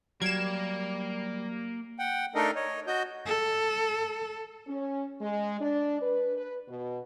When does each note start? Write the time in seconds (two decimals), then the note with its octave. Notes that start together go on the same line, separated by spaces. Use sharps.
0.22 F#3 G3 A#3 G#6 E7
1.99 F#5 G5
2.35 A3 D4 D#4 A4 A#4 D#5
2.55 C#5 D#5
2.87 F#4 D#5 G6
3.26 A4
4.68 C#4
5.20 G#3
5.60 D4
6.00 B4
6.36 B4
6.68 B2